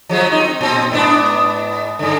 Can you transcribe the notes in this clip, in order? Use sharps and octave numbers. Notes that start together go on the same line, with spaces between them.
F3 F#3 G#3
C4 D#4
A#2 C4
G#2 B3 D4
G2 D3